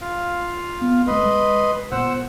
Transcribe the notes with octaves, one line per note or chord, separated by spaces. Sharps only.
F4 F5
B3
A3 B3 B4 D#5 C6
G#3
A#2 B3 C5 F#5 E6